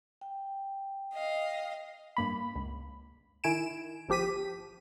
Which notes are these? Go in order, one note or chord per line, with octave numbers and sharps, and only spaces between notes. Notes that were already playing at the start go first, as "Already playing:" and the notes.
G5
D#5 F5
G2 A#3 B5
C#2
D#3 E4 G#5 D7 E7
G1 F3 G4 B6 D#7